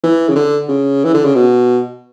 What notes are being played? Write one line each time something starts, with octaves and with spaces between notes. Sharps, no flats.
E3
C#3
D3
C#3
E3
D3
C#3
B2